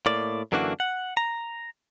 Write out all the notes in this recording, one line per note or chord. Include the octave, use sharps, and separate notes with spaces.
A2 A#3 D5
F#2 D3 E3 A#3 D4 F#4
F#5
A#5